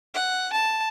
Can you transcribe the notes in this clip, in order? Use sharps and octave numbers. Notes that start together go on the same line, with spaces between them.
F#5
A5